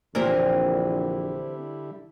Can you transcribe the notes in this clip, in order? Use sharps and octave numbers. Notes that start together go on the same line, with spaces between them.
A#1 A#2 D3 E3 G3 C4 E4 A#4